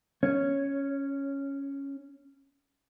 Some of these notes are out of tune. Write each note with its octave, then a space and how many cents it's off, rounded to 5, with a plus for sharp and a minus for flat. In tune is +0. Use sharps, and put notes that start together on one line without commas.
C#4 +0 C#5 +0